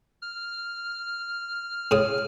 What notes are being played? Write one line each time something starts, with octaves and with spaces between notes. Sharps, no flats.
F6
A2 C#3 D#6